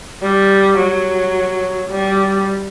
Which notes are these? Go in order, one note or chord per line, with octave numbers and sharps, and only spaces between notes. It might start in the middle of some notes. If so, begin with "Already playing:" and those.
G3
F#3
G3